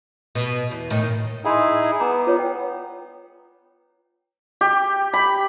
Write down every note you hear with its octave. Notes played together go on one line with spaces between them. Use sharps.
B2
E2
A2 D#3
D#4 E4 G#4 F#5 B5 C6
B3 A#5 D6 D#6
F4 B4 C#5
G5
G4
B5